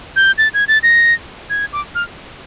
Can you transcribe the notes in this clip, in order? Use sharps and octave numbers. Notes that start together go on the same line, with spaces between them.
G6
A6
G#6
A6
A#6
G#6
D6
F6